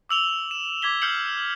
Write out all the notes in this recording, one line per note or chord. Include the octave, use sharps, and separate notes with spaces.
D6 E6 F7 G7
E7
D6 G#6 B6 G7
F6 G6 C7 C#7 F#7
E7